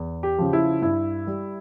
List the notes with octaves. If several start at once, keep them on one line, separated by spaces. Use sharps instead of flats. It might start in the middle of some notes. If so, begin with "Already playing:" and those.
Already playing: E2
G4
C#3 F3
E4
G2 E4
G3